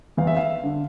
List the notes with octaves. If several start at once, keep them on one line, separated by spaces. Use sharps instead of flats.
E2 F5
E5
F5
D3